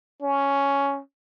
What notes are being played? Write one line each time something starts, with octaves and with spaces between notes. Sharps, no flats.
C#4